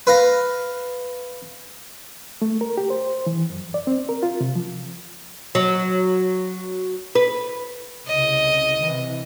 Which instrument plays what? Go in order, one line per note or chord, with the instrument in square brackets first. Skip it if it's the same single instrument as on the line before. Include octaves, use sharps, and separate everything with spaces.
[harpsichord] B4 F5 A#5
[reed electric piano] A3
A#4
G4
C5
E3
F#2
D5
C4
A#4
F4
C3
F3
[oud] F#3
B4
[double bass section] C2 C#3 [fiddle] D#5
[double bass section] C3 E3